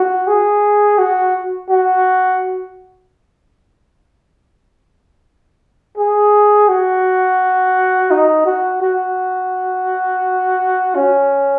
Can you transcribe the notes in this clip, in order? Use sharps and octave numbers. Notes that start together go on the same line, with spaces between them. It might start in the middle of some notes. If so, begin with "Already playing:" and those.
Already playing: F#4
G#4
F#4
F#4
G#4
F#4
D#4
F#4
F#4
C#4